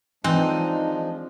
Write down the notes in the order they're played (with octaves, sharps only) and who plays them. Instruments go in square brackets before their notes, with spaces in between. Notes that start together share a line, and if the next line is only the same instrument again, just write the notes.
[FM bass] E3 [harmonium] F3 G#3 D4 [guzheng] C4 G5 [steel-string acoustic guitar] D#4